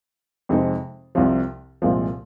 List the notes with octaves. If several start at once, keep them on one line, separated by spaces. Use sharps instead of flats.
F2 C3 G#3 C4 D#4
C2 C3 F3
C2 A#2 F3 G#3 C4